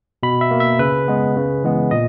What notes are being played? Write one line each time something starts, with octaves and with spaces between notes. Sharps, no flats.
B2 B5
E5
A#3
E5
C#3 B4
G#3 B3
C#3
E3 G#3 B3
A#2 D#5